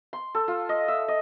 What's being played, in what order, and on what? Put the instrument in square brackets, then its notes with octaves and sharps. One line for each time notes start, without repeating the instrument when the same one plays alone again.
[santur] C6
A4
F4
D#5
E5
D#5